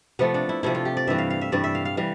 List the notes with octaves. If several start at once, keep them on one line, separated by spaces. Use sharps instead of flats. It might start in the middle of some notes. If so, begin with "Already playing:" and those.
C3 F3 A3 B3
D4
E4
C3 F3 A3 E4
F4
G4
D5
G2 E3 G3 E5
F5
F5
E5
G2 E3 G3 D5
E5
F5
F5
E3 G3 F5